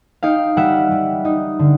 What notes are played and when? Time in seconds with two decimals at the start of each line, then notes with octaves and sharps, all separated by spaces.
0.23 D#4 F5 G5
0.57 G3 E5 F#5
0.91 G3
1.25 D#4
1.59 D3